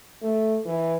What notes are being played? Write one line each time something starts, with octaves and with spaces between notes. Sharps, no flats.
A3
E3